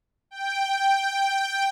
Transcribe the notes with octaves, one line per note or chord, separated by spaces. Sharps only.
G5